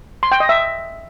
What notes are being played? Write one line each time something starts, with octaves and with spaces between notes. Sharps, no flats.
C6
G5
D#5
E5